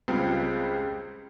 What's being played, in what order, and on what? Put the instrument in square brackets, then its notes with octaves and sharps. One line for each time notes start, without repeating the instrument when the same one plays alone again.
[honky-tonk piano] C#2 C#3 G3 C4 F4